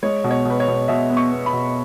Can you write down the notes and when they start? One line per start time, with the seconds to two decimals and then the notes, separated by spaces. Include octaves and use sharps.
0.03 G#3 C#5
0.24 B2
0.31 C#5
0.45 B2 B4
0.60 C#5
0.67 B2
0.88 B2 E5
1.10 B3
1.17 C#6
1.31 B3
1.46 B5
1.53 B2